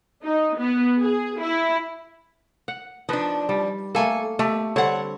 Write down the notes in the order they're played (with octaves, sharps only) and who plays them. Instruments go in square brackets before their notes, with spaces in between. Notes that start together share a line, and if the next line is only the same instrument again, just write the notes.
[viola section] D#4
B3
G#4
E4
[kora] F#5
[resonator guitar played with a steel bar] F3 D4 [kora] D#4 B4
[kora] G3
[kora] A3 A#3 [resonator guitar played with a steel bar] A4 G#5
[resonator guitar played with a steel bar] A3 [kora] G4
[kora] D3 G3 C4 [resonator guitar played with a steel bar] C#5 F#5